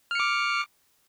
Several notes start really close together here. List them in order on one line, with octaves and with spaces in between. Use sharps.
F6 C#7 D6